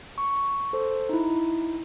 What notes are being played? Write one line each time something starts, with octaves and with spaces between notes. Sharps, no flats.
C#6
A4 C5
D#4 E4